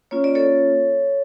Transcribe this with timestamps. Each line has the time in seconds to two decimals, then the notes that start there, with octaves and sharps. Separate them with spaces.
0.11 A#3 C#4 F4 C#5
0.24 D5
0.35 A4 C#5